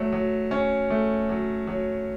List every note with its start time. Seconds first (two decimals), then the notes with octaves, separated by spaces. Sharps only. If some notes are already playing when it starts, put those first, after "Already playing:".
Already playing: F#3 A3
0.12 F#3
0.51 C#4
0.90 A3
1.29 F#3
1.67 F#3